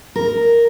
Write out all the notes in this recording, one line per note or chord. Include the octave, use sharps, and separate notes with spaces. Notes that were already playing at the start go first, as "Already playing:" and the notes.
A#4